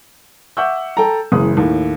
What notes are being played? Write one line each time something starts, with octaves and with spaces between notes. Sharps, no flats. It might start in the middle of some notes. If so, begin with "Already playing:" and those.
E5 F#5 C#6 D6 E6 G6
A4 G5 A5 A#5
F#1 E3 G#3 D#6
D#2 A2